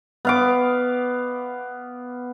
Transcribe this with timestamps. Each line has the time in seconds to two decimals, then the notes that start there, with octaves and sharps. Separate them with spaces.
0.25 B3 F5 D6